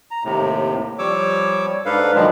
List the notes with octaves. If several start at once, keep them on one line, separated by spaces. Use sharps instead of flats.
A#5
D#2 A2 C3
F3 G3 C#5 D6 E6
G#2 D4 A4 B4 F5
D#3 F3 F#3 G#3 D4